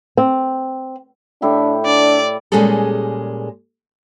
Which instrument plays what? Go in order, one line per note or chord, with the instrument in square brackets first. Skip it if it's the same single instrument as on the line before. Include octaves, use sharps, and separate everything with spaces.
[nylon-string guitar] C4
[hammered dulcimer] A2 E4 G4 [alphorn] D4
[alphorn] D4 [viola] D5
[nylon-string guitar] A#2 G3 G#3 C#4 G#4 A4